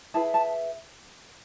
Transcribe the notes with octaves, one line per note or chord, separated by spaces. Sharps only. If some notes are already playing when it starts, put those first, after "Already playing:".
E4 G#4 B4 A5
A5